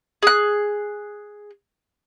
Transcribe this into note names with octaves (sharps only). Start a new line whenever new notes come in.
G#4 F#6